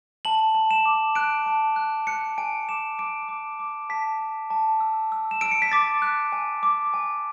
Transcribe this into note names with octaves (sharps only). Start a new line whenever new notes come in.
A5 F#7
A5
E7
D6
F#6 D7
A5
F#6
F#6 C#7
G#5 D7
D6 E7
D6 D7
D6
D6
A5 B6
A5
A5
E6
E6
E7
E6 D7
C#7
B6
D6 A6
F#6
G#5
D6
G#5